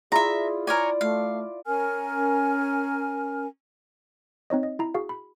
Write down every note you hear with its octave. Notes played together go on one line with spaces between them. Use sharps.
E4 F4 G#4 D5 E5 A#5
A#4 C#5 D5 G#5
A3 F5
C#4 A#4 G#5 F6
C4 D#4 C#5 D#5
D#5
E4 A#5
F#4 G#4 F5
B5